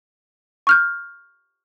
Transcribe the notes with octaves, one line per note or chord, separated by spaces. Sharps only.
C#6 F6 G6